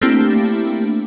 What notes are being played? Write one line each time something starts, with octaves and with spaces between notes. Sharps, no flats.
A3 A#3 C4 D4 E4 G4